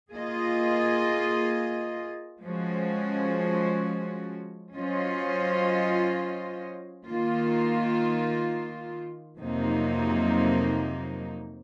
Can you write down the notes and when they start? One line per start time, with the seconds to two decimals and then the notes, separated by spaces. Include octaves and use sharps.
0.13 A#3 F4 G#4 D#5
2.45 F3 G#3 C#4 F#4
4.77 F#3 C#4 F4 C5 D#5
7.09 D#3 A#3 F4
9.40 F2 C3 F#3 A#3 D#4